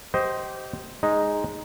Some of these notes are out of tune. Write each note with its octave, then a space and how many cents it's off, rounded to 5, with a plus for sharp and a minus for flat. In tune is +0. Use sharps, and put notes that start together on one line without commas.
G4 -25 C5 +0 D#5 +10
G#3 +0 D#4 +0